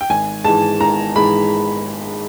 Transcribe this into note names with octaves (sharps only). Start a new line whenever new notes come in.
G5
G#1 G#5
G#2 E3 G#3 A5
G#1 A#5
G#2 E3 G#3 B5